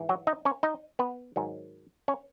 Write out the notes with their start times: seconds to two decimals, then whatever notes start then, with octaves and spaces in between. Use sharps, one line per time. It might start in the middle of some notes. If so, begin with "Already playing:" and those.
Already playing: G#2 E3
0.09 F#3 F#4
0.27 D#4 D#5
0.45 C#4 C#5
0.63 D#4 D#5
0.99 B3 B4
1.36 G#2 D#3 F#3
2.08 C#4 C#5